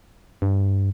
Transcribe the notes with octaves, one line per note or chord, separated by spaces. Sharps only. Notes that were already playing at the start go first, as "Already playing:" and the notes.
G2